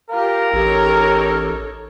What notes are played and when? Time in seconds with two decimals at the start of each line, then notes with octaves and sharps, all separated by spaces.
0.10 F4 G4 A#4 F5
0.53 A1 D#4 G4 A4 C#5